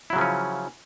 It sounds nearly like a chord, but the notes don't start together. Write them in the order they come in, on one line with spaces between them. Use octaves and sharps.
E4 F#3 C#3 F3 C#4